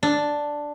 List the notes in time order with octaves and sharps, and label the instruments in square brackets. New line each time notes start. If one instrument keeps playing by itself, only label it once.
[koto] D4